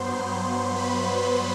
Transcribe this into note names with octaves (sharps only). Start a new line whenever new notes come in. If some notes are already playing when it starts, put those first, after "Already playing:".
Already playing: G2 F#3 B3 C5 C6
B4 B5